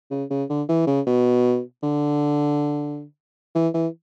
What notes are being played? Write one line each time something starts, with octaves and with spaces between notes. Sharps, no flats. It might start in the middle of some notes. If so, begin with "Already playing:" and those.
C#3
C#3
D3
E3
C#3
B2
D3
E3
E3